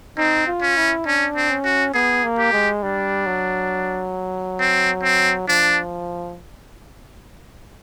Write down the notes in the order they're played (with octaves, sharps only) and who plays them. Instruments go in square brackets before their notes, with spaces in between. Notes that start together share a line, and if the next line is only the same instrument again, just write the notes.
[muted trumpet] C4 [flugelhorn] D#4
[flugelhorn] F4
[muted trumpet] C#4
[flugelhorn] E4
[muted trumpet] C#4 [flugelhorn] D4
[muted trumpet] C4
[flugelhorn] C#4
[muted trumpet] F#4
[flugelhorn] B3 [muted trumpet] G#4
[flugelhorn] A#3
[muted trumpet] G4
[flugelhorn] G#3
[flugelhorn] G3 [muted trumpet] D4
[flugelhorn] F#3
[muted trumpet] C4
C4
[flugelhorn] F3 [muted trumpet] D4